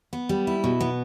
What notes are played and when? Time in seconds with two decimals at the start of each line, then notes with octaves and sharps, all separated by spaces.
0.13 B3
0.29 G3
0.47 E4
0.64 B2
0.81 B3